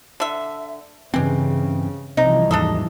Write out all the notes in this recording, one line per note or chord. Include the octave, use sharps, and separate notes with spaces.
D3 E5
G2 C#3 E3 G#3 C4 G4
C2 C3 E3 F3 D#4
D#2 G#2 D4 A4 D#5